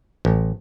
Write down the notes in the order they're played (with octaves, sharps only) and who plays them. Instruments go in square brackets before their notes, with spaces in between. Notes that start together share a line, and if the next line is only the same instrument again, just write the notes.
[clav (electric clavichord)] A1